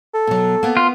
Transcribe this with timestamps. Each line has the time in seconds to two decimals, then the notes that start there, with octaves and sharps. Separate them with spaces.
0.14 A4
0.27 B2 F#3
0.63 A#3 B3
0.77 F4